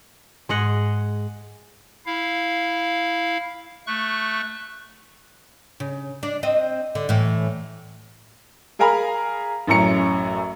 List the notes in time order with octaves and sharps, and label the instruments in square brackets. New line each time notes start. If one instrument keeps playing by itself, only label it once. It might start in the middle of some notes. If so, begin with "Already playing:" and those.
[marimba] G#2 [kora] G#3 D#5 F#5
[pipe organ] E4 F5
A3 C#6 F#6
[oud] C#3
D4
C4 D#5
D3
A2 E3
[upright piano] G#4 A#4 F5 G#5 A#5 B5
A1 F#2 A2 C#4 A#5 C#7